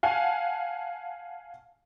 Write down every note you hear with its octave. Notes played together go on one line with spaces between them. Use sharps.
F5 F#5 G#5 A5